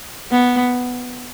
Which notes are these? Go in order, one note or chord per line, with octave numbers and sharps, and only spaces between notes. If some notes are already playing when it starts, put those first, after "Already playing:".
B3